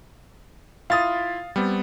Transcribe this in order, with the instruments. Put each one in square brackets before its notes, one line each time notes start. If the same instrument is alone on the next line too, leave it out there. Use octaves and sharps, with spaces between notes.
[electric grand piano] E4 F4 A6 [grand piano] F5 D#6
[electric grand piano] G3 B3 C4